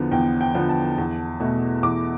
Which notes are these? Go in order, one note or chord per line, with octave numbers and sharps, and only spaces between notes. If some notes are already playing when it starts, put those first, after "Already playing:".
Already playing: E2 D3 F3 B3
E2 G5
G5
D3 F3 B3
A5
E2
B2 A3
E2 D6